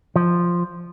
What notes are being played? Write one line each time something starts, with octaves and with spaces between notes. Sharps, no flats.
F3